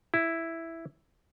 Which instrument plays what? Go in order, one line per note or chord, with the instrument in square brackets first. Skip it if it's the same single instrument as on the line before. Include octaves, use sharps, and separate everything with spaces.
[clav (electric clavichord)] E4